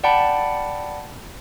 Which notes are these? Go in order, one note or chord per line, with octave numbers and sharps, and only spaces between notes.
D5 F#5 G5 A5 B5